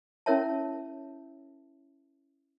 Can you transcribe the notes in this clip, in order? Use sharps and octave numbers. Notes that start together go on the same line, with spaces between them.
C#4 E4 A#4 C#5 E5 A5